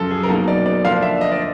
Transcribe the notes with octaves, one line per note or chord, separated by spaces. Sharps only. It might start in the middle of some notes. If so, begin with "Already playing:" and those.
Already playing: F#2 C#3 F3 A4
G#4
A#4
B2 F#3 A#3 D#4 A4
D5
D5
D3 F3 A#3 D4 F5
E5
D#5
D5